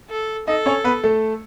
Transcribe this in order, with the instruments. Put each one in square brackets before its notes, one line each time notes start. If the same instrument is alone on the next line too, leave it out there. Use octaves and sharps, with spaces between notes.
[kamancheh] A4
[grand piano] D#4 D#5 [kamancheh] A4
[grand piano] C#4 C#5
B3 B4
A3 A4